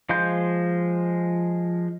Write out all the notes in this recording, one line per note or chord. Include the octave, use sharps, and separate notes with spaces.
F3 G#3 F5 C6 G6